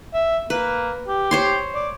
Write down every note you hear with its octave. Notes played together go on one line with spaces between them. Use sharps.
E5
A#3 B4
G4
C5 C#5 C6
D5